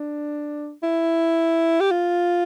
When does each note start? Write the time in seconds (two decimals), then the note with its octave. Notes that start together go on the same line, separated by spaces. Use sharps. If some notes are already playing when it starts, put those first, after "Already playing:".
Already playing: D4
0.83 E4
1.80 G4
1.91 F4